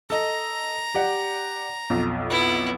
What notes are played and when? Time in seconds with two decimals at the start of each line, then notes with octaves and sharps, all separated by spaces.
0.10 A4 D#5 A#5
0.95 G4 D5 F#5
1.90 B1 F2
2.30 B3 E4